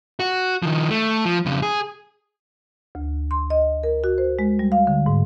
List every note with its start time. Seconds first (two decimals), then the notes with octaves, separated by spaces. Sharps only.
0.20 F#4
0.63 D#3 F3
0.91 A3
1.25 F3
1.46 F2 C#3
1.62 G#4
2.95 D2
3.31 C6
3.50 D#5
3.83 A#4
4.04 F#4
4.18 C5
4.39 G#3
4.59 G3
4.72 F5
4.87 D3
5.06 G#2